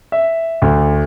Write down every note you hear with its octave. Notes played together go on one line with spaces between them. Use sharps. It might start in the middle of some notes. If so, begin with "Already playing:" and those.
E5
D2